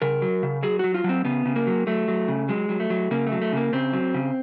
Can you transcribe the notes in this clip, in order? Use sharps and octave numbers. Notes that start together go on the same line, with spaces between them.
C#3 A#4
F#3
C#3
F#3 G#4
F#3 F#4
F4
F#3
C4
C#3 B3
C#3
A#3
F#3
F#3 A3
F#3
C#3
F#3 G#3
F#3
A3
F#3
C#3 A#3
A3
F#3
A3
C#3 A#3
C#3 C4
F#3
C#3